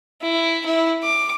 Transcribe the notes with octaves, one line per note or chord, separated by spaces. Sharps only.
E4
E4
D6